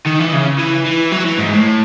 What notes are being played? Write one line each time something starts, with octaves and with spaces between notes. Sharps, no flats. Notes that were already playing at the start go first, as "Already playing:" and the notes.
D#3
E3
C#3
E3
E3
F#3
E3
G#2
A2